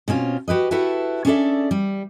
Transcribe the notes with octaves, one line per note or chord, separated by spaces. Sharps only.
B2 C4 C#4 F4
F#4 G4 B4 D#5
E4 F#4 G4 A4 B4 E5
C#4 D4 G#4 A4 D5 E5
G3